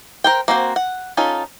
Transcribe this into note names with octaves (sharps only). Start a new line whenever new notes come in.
A#4 C5 G5
A#3 C4 F#4 A4 C5
F#5
C#4 D#4 F4 A4